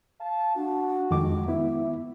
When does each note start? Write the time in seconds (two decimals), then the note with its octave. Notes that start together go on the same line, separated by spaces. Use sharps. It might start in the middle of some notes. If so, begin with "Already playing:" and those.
0.20 F5 A5
0.56 D4 F#4
1.11 F2 D#3 G#3 D6
1.48 B3 E4 E5